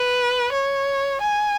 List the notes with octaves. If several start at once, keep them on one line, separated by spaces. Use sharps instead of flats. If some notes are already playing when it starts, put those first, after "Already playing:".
Already playing: B4
C#5
G#5